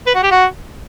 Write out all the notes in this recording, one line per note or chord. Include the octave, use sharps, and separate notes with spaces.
B4
F#4
G4
F#4